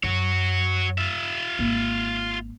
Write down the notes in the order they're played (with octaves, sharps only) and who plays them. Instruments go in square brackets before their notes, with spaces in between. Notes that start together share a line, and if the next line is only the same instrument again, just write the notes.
[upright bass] F#2 [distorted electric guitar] F#4 C#5
[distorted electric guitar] F4 E5
[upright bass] G#1 A#3